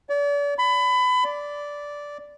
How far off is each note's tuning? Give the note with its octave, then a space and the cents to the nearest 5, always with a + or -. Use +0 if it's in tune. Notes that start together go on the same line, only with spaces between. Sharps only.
D5 -40
B5 +25
D5 -10